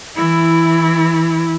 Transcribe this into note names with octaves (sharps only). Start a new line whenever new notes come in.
E3 E4